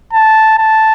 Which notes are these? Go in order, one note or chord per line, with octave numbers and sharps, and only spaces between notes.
A5
A5